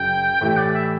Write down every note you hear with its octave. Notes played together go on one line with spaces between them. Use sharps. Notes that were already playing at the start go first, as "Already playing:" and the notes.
Already playing: F#1 F#2 F#3 G5
A2 E3 A3 E4 G4 G5
D5
E5